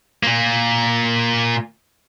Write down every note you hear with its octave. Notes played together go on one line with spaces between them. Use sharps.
A#2 A#3